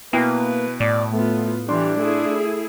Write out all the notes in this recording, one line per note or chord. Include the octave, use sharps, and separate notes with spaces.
B2 A#3 E4 B4 G5
A2 D5
A3 B3 F4
E3 G3 D4 C6
A3 E4 G#4